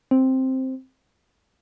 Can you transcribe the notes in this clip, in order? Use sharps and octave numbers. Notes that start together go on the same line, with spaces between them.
C4